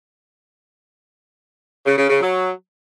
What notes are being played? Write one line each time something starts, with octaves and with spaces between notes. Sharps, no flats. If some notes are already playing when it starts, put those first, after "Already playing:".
C#3
C#3
C#3
F#3